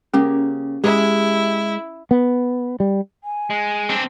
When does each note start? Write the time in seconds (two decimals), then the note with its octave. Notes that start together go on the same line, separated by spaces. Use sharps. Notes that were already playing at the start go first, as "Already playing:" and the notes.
0.14 C#3 A#3 C#4 G4
0.84 G#3 E4 G4 G#4
2.11 B3
2.80 G3
3.24 G#5
3.50 G#3
3.90 C4 D4